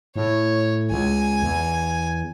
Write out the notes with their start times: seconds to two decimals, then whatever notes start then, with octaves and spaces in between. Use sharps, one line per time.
0.16 A2 C#5
0.91 C#2 G#5
1.43 E2